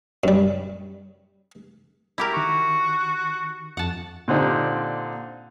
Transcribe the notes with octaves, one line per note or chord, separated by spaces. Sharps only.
F#2 G3
E4 G4 A#4
D#3 F#4 C#6
F2 F#5 A5
A#2 D3 C4 D#4 G4